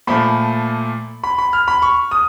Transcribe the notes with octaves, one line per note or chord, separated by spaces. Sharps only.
A#2 F3 A3 B5
B5
B5
F6
B5
C#6
D#6